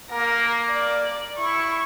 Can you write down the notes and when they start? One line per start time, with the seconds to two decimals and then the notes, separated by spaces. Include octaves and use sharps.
0.11 A#3 A#4
0.72 D5
1.38 E4 C#6